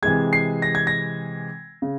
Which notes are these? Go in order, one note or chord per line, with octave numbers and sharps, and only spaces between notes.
C3 E3 G#3 G#6
C7
A#6
G#6
A#6
C#3